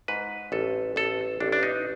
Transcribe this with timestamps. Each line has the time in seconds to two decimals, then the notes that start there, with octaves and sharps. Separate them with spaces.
0.08 G#2 B4
0.52 A1 A4
0.96 A1 A4
1.40 A1 D4
1.52 D4
1.63 D#4